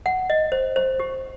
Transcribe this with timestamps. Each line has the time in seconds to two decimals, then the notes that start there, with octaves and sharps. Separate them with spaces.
0.06 F#5
0.30 D#5
0.52 C5
0.76 C5
0.99 G4